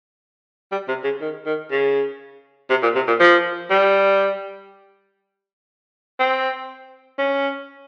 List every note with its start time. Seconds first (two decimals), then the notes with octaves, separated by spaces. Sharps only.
0.72 G3
0.88 C3
1.04 C#3
1.21 D#3
1.46 D#3
1.71 C#3
2.70 C3
2.83 A#2
2.95 C3
3.08 A#2
3.20 F3
3.70 G3
6.19 C4
7.18 C#4